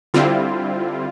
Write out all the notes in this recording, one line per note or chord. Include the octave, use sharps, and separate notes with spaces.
D3 G3 C4 E4 F4